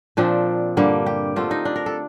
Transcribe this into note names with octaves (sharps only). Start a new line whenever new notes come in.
A#2 F3 C4 D4
G2 D3 G3 A#3
G4
D3 A3 C4 F4
D#4
D4
A#4
A4